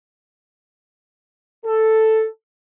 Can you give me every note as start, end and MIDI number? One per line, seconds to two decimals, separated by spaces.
1.66 2.26 69